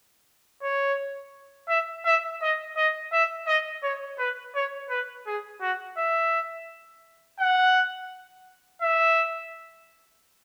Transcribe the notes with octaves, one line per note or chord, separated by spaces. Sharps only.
C#5
E5
E5
D#5
D#5
E5
D#5
C#5
B4
C#5
B4
G#4
F#4
E5
F#5
E5